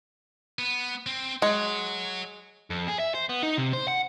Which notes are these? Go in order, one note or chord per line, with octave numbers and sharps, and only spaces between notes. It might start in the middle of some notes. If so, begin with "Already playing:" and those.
B3
C4
G#3 C#5 F#5
F2
G#4
E5
C5
B3
D#4
C3
C5
F#5